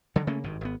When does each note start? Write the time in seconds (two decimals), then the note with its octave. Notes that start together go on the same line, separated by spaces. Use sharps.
0.16 D3 D#3 F#3
0.27 C#3 A3 A#3 C#4
0.44 G#1 G2 D#3
0.61 G#1 B3